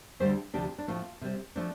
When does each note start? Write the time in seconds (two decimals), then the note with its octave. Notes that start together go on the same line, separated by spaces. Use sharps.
0.20 D2 D3 G3 C4 G4 C5
0.54 D2 C3 F3 D4 G4
0.78 D4
0.88 A2 F3 A3 C4 F4
1.21 C3 G3 C4
1.56 F3 A3 C4 D4